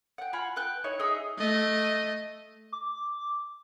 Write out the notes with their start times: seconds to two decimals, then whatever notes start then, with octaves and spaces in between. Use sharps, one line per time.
0.18 F#5 G5
0.33 F4 F#5 G#5 B5
0.56 B4 G5 F#6
0.84 D#4 E4 C#5 C#6
0.99 D#4 G#4 D#5 E5
1.38 A3 D#5
2.72 D6